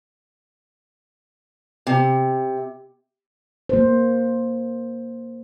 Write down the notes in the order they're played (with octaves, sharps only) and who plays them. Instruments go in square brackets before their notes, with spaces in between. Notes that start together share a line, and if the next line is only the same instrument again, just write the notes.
[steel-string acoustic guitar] C3
[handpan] A#3 C5